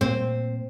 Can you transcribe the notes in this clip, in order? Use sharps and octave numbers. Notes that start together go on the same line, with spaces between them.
A#2 C4